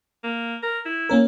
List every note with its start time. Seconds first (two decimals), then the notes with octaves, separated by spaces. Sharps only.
0.23 A#3
0.63 A#4
0.85 E4
1.09 A#3 C#4 A#4